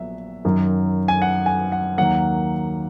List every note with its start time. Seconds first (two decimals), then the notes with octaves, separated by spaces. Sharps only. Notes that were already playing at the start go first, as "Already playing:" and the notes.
Already playing: A#1 A#2 F#3 B3 E5
0.45 F#2 D#3 F#3
1.08 G#5
1.22 F#5
1.46 G#5
1.72 F#5
1.97 D#2 D#3 F#3 A#3 F#5